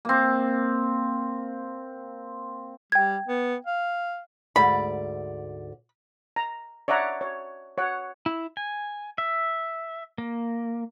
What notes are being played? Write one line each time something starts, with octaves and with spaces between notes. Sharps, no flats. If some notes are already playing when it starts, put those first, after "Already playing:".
A#3 C4
G3 G5 G#6
B3
F5
D2 G#2 D5 B5
A#5
C#5 D5 E5 F#5 A#5
C#5
C#5 F#5
E4
G#5
E5
A#3